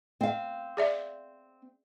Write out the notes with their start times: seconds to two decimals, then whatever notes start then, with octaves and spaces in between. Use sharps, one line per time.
0.21 C4 F5
0.77 G#4 D5 E5